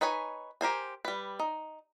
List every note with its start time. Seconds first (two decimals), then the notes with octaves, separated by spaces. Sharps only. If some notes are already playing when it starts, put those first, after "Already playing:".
0.01 D#4 B4 C#5 G#5
0.61 G4 A#4 C5 G#5
1.05 G3 B4
1.39 D#4